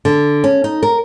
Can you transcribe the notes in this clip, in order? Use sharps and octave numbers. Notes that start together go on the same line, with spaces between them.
D3
C#4
D#4
A#4